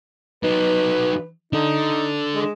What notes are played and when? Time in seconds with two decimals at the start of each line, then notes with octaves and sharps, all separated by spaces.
0.43 F#3 D#4 B4
1.53 D4 D#4 A4
2.34 G#3